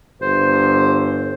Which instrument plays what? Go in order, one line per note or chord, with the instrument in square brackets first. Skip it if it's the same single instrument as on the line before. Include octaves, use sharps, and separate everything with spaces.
[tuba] G1 [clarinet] C5